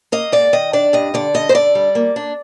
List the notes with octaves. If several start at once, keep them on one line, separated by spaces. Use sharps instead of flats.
A#3 D#5
G#2 D5
D#3 D#5
D4 D5
G2 D#5
D3 D5
G2 D#5
C5
D3 D5
G3
A#3
D4